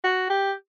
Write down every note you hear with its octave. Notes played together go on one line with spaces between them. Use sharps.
F#4
G4